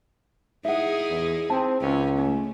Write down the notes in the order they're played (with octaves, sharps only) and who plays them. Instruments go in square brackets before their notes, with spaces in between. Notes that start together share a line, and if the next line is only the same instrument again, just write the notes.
[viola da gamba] D#4 E4 G#4 [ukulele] E5 F#5
[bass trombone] E2
[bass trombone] C4 [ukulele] A5
[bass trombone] C#2 [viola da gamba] C#4
[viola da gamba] A3 [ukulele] C#4